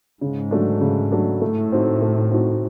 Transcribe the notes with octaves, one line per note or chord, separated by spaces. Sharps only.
G#2 C#3
F#3 A3 D4
C#3
F#3 A3 D4
A2 A3
C4 D#4 F#4
A3
C4 D#4 F#4